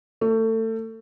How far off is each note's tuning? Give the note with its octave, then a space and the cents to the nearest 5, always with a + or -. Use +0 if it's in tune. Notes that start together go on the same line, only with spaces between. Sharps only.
A3 +25